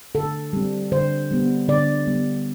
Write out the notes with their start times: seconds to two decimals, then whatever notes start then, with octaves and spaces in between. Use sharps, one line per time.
0.15 D3 A4
0.53 G3 C4
0.92 D3 C5
1.31 G3 B3
1.68 D3 D5
2.07 G3 B3